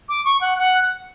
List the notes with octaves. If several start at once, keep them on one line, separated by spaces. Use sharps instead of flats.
D6
C#6
F#5
F#5